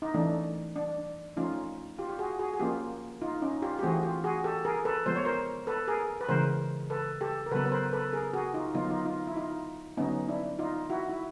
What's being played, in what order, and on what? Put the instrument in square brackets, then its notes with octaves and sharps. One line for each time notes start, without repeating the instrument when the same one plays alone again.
[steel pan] D#4
E3 A3 C#4 D4
D4
F3 A3 C#4 D#4 F4
F4 G4
G4
F#4 G#4
F#4 G#4
G#4
F3 A#3 C#4 F4 G4
D#4 F4
C#4 D#4
F4 G4
G4
E3 A3 C4 F#4 G#4
F4 G4
F#4 G#4
G4 A4
G#4 A#4
A4 B4
F3 G#3 B3 C5
C#5
A#4 C5
A4 B4
G#4 A#4
B4
C#3 E3 G#3 A#4 C5
A4 B4
G4 A4
A#4
C#3 F#3 B3 A4 B4
B4
A#4 C5
A4 B4
G#4 A#4
F#4 G#4
D#4 F4
D3 F#3 B3 D#4 F4
D#4 F4
D#4 F4
E4
D#4 F4
D3 F#3 B3 C#4 D#4
D4 E4
D#4 F4
E4 F#4
E4